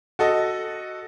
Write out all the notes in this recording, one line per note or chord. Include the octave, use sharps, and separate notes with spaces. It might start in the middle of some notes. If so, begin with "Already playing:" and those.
F#4 A4 D#5